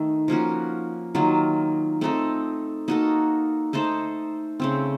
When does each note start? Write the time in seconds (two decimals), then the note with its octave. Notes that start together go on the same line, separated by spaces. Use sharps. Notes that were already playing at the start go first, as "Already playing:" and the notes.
Already playing: D#3 A3 D#4
0.28 F3 A#3 C#4 F#4
1.15 D#3 F#3 A#3 F4
2.01 A3 C4 D#4 A4
2.88 A#3 D#4 F#4 A4
3.73 A3 D#4 A4 C5
4.60 C#3 A3 C4